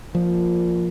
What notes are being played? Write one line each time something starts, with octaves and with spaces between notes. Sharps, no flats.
A#2 F3